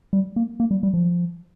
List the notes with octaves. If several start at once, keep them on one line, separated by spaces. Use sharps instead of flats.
G3
A#3
A#3
G3
G3
F3